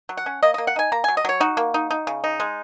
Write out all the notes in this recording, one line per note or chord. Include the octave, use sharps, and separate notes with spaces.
F#3
F#5
C#4
A#3 D#5
A#3 D#5
F#5
D#4 G#5
A#3 A#5
F#3 G#5
D#5
F#3 C#5
D#4 F#4
A#3
D#4
D#4
C#3
D#4
G#3